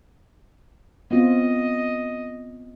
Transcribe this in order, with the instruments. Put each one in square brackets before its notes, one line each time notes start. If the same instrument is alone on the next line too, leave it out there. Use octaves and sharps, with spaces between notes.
[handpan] B3 C4 F4 [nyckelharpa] D#5